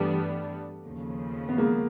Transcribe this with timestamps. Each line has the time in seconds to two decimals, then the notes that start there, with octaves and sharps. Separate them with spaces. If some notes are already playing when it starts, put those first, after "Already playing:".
Already playing: G2 E3 G3 A3 B3 D4
0.83 D#2 C#3 F3
1.49 B3
1.58 G#3 A#3